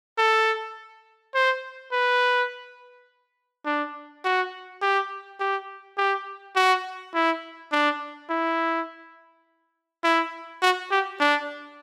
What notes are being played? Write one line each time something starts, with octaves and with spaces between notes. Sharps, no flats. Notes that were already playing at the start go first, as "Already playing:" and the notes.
A4
C5
B4
D4
F#4
G4
G4
G4
F#4
E4
D4
E4
E4
F#4
G4
D4